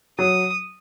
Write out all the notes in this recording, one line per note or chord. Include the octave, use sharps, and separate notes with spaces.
F#3 D#6